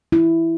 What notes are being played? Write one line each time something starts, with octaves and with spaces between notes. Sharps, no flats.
E4